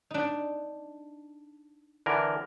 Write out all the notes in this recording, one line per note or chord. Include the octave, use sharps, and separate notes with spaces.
D4 D#4
D3 E3 A#4